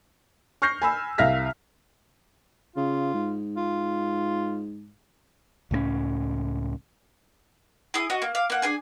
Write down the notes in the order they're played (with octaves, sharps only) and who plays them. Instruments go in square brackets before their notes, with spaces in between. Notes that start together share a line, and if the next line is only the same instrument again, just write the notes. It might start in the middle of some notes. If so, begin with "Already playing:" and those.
[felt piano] C#6 F6 G6 A#6 C7
G#5 B5 E6
C2 E5 F5 F6 A#6 B6
[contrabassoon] C#3 [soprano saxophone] F4
[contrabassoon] G#2
[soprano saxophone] F4
[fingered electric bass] C#2 A2 G#3 C#4
[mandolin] E4 G#4 D#6
F#4 D#5
A#3
F5 D6
A#3 F#5
D4 G#4 G#5